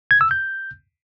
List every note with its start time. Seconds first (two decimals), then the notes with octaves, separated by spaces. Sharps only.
0.11 G#6
0.21 E6
0.31 G6